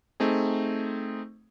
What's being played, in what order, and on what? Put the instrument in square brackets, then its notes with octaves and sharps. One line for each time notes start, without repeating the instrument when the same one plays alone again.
[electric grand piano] A3 C4 D#4 G#4